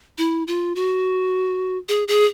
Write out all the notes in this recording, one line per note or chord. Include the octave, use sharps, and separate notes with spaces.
E4
F4
F#4
G#4
G#4